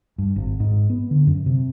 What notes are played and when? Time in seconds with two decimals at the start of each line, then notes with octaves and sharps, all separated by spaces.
0.18 G2
0.36 G#1
0.60 G#2
0.90 B3
1.11 D3
1.27 F#2
1.46 C3